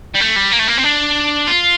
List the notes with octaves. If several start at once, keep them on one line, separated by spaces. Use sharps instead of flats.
G3
A3
G3
A#3
A3
A#3
C4
D4
F4